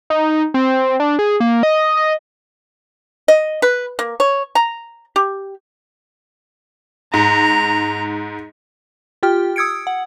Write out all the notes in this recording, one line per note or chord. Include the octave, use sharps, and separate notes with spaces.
D#4
C4
D4
G#4
A#3
D#5
D#5
D#5
B4
A#3
C#5
A#5
G4
G#2 A#5
F4 G4 G5 F6
D#6 E6 G#6 C#7 D7
F#5